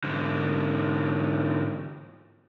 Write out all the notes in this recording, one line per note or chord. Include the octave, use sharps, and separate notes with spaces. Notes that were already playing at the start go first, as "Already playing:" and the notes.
G#2 D3